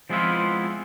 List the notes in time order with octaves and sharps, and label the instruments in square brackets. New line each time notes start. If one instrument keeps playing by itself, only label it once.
[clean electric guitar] F3 G#3 B3 C4 E4 F4